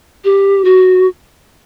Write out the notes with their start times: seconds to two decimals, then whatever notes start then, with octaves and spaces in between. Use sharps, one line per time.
0.24 G4
0.64 F#4